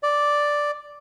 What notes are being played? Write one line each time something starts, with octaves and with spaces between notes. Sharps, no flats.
D5